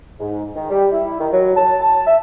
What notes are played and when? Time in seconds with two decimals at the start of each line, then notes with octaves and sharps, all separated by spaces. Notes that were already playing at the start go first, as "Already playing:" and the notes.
0.20 G#2
0.56 D#3
0.70 G3
0.92 E4
1.20 D#3
1.32 F#3
1.56 A5
1.80 A5
2.07 E5